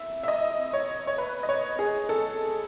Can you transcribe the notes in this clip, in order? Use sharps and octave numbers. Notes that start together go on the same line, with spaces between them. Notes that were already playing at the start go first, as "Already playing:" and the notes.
Already playing: E5
E5
D#5
C#5
C#5
B4
D#5
C#5
G#4
A4